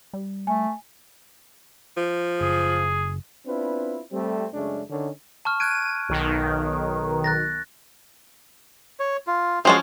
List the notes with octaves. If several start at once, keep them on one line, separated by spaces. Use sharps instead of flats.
G3
A3 G#5
F3
F#1 G#4
B3 C4 D4 E4 F4 B4
G3 A3 C4
F#2 C#3 G#3 A3 C#4 D4
D3 D#3 C#4
A5 C#6 F6
F#6 G#6 D7 D#7
B1 D#3
F#6 A6 A#6
C#5
F4
F3 G#3 C#4 F#4 A5 C6